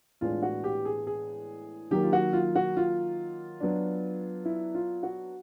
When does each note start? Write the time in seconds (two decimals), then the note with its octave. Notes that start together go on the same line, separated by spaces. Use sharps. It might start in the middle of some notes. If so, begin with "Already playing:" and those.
0.21 A2 E3 G#3 B3 D4 F4
0.42 F#4
0.64 G4
0.85 G#4
1.07 G#4
1.91 D#3 F#3 A#3 G4
2.03 F4
2.13 F#4
2.33 F4
2.55 F#4
2.77 F4
3.60 F#3 B3 D4
4.45 E4
4.75 F4
5.03 F#4